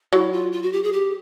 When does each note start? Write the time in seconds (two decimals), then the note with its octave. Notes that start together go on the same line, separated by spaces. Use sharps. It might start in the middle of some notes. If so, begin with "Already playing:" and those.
0.13 F#3 E4
0.33 F4
0.52 F4
0.62 F#4
0.73 G4
0.83 G#4
0.93 G4